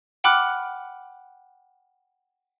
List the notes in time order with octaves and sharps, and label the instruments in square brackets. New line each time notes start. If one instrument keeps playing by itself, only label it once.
[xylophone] F#5 G5 B5 D6 F6 F#6